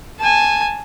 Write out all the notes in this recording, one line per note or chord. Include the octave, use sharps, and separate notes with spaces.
G#5 A5